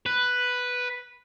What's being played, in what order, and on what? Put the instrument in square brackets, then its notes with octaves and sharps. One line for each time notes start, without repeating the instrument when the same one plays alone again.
[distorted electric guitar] B4